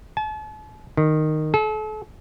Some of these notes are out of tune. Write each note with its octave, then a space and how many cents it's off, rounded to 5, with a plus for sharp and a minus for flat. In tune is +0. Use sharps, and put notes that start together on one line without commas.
A5 -40
D#3 -10
A4 -40